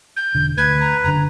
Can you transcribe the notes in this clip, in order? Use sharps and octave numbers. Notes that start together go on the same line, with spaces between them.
G6
E1 D3
D2 B4 G#6
A#5
F#1 D3 A#5